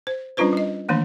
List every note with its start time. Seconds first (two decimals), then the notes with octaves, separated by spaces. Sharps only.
0.07 C5
0.37 G3 C#4 D4 F4 B4 C5
0.53 G3 D#5
0.89 D#3 E3 A3 A#3 D4